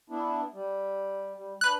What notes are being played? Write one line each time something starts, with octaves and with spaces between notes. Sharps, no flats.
B3 D4 E4
G3
G3
D4 B4 F#6